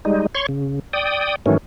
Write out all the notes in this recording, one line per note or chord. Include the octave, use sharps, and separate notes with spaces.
G3 G#3 D#4
C#5 C6 C#6
C#3
D5 G5 D#6
G#2 D#3 E3 F#3 A3 C#4